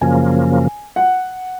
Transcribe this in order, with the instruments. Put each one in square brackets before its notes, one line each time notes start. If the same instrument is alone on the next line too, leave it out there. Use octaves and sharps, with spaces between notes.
[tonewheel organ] F#2 C#3 F3 A#3 [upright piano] G#5
[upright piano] F#5